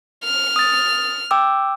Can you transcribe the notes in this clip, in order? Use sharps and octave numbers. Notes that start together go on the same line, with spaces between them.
F6
D#6 A6
G5 D6 E6